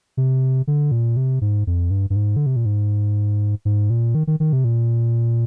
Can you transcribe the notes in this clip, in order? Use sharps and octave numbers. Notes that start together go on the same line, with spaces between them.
C3
D3
A#2
C3
G#2
F2
G2
G2
G#2
D3
C3
A#2
G#2
G#2
A#2
D#3
D#3
D#3
C3
A#2